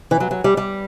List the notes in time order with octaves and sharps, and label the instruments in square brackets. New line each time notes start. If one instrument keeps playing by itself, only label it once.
[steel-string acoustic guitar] E3
F#3
F#3
G3
G3